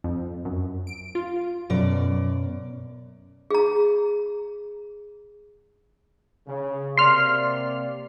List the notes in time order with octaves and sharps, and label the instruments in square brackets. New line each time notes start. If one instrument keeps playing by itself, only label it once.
[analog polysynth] F2
F#2
D7
F4
[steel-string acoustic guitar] F#2 B2 D5
[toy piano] G#4 A#5
[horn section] C#3
[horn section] C3 A#3 D5 [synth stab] C6 F6